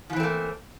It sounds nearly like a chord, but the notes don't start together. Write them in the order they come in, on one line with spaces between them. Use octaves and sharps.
F3 E3 C4 A3 A#3